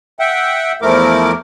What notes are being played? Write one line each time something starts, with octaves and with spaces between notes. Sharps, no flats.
E5 F#5 G5
E2 F3 A3 E4 A#4 D6